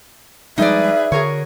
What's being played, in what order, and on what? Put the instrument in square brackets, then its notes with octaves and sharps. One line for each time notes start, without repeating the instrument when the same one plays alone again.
[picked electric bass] F3 G3 G#3 [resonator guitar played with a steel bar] D#4 D5 [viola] G#4 B4 [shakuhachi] E5
[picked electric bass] D3 [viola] F#4 [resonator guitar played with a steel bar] G#4 A#4 C#5